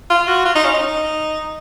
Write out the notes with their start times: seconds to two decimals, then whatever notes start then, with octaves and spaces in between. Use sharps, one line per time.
0.10 F4
0.27 F#4
0.45 F4
0.56 D#4
0.64 C#4
0.74 D#4